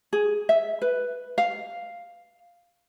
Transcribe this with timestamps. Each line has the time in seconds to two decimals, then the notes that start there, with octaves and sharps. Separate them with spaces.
0.13 G#4
0.49 E5
0.82 B4
1.38 F5